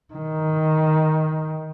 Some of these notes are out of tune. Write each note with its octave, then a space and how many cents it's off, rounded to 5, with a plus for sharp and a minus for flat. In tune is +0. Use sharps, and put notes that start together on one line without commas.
D#3 +10